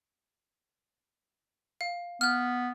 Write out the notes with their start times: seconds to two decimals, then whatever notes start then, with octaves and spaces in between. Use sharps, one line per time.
1.81 F5
2.21 B3 F6 F#6